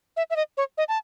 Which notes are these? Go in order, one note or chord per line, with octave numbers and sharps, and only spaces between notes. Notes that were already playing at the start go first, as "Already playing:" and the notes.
E5
E5
D#5
C#5
D#5
A5